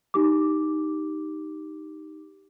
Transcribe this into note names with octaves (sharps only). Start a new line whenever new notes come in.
D#4 G4 D6